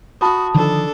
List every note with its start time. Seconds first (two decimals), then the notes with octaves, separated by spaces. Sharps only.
0.21 F#4 A5 B5 D#6
0.54 D3 D#3 F3 D4 A4